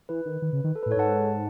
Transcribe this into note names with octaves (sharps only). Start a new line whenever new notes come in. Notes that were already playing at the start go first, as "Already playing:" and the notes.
E3 B4
D#3
D#3
C#3
D#3
A4
A2 B4
A4 C#5
G#2 F#5 A5